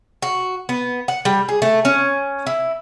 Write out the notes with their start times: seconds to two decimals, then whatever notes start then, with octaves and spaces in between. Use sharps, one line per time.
0.22 F#4
0.69 B3
1.08 F#5
1.25 G3
1.49 G#4
1.62 A3
1.85 C#4
2.47 E4